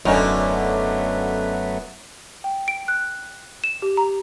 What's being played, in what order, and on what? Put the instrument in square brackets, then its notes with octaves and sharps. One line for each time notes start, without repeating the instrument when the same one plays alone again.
[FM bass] D#1 [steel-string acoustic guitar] F#2 [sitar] D3 C#4 D#4 [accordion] F#3 A3 B3
[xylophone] G5
D7
F#6
E7
G4
A#5